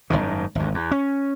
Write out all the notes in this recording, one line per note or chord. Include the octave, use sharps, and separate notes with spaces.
F#1 B1 G#2 D#3
G#1 D2
E2
C#4